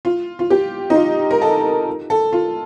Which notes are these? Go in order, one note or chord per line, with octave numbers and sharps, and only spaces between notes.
F4
F4
G4
D#4
F4
A#4
A4
A4
F4